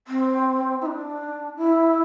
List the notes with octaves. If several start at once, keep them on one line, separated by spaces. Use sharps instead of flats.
C4
E4
D4
E4